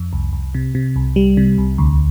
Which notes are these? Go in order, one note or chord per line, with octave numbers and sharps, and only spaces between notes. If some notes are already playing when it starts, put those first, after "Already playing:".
Already playing: F2
C2
C2
C3
C3
C2
G3
C3
C2
D2